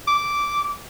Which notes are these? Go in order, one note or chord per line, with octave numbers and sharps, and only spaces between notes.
D6